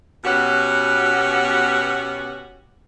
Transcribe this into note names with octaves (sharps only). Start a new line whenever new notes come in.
B2 B3 C#4 F#4 G4